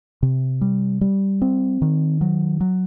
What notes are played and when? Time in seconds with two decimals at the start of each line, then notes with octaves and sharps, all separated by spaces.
0.23 C3
0.61 G3
1.01 G3
1.42 C4
1.82 D#3
2.21 F#3
2.61 F#3